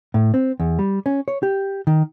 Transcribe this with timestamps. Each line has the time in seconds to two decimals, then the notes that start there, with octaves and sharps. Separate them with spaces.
0.14 A2
0.34 C4
0.60 E2
0.79 G3
1.06 C#4
1.28 C#5
1.43 G4
1.87 D#3